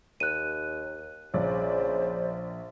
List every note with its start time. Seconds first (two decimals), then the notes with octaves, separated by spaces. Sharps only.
0.20 D#2 F#6 D#7
1.34 A#1 C#3 C5 D5